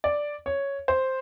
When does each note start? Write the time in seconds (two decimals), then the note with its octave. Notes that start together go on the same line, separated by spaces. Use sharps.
0.04 D5
0.46 C#5
0.88 C5